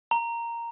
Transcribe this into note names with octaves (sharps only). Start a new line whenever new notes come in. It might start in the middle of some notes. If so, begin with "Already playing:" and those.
A#5